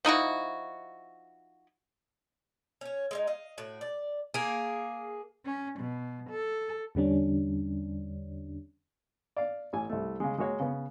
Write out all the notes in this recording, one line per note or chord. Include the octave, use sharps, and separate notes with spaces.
F3 D#4 E4 F#4
C#4 C#5
G#3 A#3 D#4
D#5 F5
A2 F#4
D5
A#3 G#4
C#4
B2
A4
E2 D3 G3 C#4 D4
D5 F5
A1 G#5
C2 A3
C#3 G#3
G#3 A#3 F#4 C#5
C#3 B3